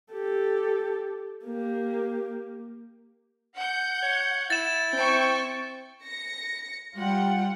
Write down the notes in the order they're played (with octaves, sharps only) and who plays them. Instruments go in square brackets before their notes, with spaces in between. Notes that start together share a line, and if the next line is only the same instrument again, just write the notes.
[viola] G4 A4
A#3 G4
[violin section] F#5 G6
[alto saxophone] C#5
[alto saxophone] E4 [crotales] A6 E7
[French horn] C4 [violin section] G5 C#6
[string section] A#6 C#7
G3 F4 F#5 G5